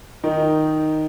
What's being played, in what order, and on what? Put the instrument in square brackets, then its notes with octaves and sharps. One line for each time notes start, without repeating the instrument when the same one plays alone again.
[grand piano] D#3 D#4